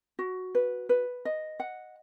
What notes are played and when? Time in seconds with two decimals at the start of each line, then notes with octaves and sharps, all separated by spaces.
0.19 F#4
0.55 B4
0.89 B4
1.25 D#5
1.60 F#5